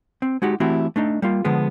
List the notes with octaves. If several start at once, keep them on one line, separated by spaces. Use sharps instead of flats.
C4
G#3 D#4 F#4 G4
E3 A3 C4 E4 F#4 G4
A3 D4 D#4
G3 A#3 F4
D3 F3 G#3 B3